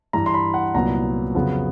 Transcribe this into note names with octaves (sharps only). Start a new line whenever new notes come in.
G2 E3 G3 A#5
C6
B5
F#5
C2 A#2 F#3 B3 A#5
F2 C#3 F#3 B3